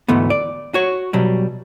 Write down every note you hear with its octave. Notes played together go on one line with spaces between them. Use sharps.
D2 G#2 E3 A3 B3
D5
F#4 C#5
B2 F#3 G3